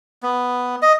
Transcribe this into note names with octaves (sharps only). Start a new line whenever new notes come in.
B3
D#5